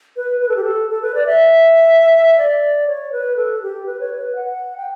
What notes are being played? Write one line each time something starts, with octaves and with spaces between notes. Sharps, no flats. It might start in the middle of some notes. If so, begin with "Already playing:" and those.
B4
B4
A4
G4
A4
A4
B4
D5
E5
D5
C#5
B4
A4
G4
B4
C#5
B4
F#5
G5